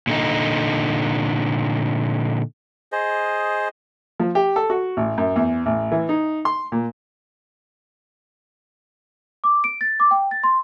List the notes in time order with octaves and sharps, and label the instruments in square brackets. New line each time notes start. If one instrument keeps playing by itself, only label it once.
[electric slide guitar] A#2 D3 D#4
[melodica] G#4 C5 D#5
[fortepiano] F3
G4
A4
F#4
A1
F#2
E2
A1
E3
D#4
C6
A#2
[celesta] D6
D7
A6
D6
G5
A6
C6